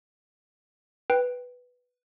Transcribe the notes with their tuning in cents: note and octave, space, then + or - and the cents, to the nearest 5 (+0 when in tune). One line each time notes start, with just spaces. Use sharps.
B4 +0 G5 +0